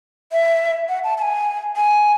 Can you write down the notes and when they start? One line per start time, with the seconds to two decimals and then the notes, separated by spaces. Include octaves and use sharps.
0.32 E5
0.89 F#5
1.04 A5
1.18 A5
1.22 G#5
1.76 G#5